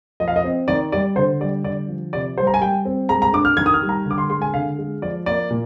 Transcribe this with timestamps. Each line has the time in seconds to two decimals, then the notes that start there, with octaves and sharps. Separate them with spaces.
0.20 F3 D#5
0.28 F5
0.36 D#5
0.44 C4
0.68 D#3 D5
0.92 G3 D5
1.16 D3 C5
1.40 G3 D5
1.64 D3 D5
1.88 F3
2.13 C3 D5
2.38 G3 C5
2.47 A#5
2.54 G#5
2.61 G3 G5
2.85 C4
3.09 G#3 A#5
3.22 A#5
3.33 D4 D6
3.45 F6
3.57 D#3 G#6
3.66 D#6
3.74 F6
3.82 G3
3.89 A#5
4.05 D3
4.11 D6
4.18 C6
4.30 G#3 C6
4.42 G#5
4.54 D3 F5
4.78 G#3
5.02 F3 D5
5.26 A#3 D5
5.51 A#2